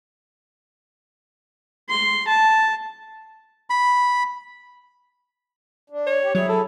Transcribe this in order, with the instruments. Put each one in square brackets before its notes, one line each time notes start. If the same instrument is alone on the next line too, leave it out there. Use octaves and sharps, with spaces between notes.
[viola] C6
A5
[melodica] B5
[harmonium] D4
[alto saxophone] C#5
[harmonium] G4
[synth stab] F#3 [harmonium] E4 G#4 [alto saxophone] C#5
[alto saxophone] A4